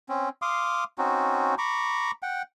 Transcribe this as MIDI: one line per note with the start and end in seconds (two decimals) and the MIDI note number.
0.09 0.29 60
0.09 0.29 61
0.42 0.84 77
0.42 0.84 84
0.42 0.84 86
0.42 0.84 87
0.98 1.55 60
0.98 1.55 61
0.98 1.55 63
0.98 1.55 66
1.58 2.11 82
1.58 2.11 83
1.58 2.11 85
1.58 2.11 86
2.23 2.42 78
2.23 2.42 79